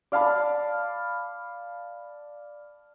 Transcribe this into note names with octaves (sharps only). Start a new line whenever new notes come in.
D5 F5 A5 B5